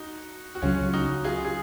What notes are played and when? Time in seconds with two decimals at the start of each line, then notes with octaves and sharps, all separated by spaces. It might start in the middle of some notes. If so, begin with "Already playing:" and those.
Already playing: D#4 F#4
0.55 F#4
0.62 C#2 C#3 F#3 C#4 F4
0.93 D#4 F#4
1.24 F4 G#4
1.45 G#4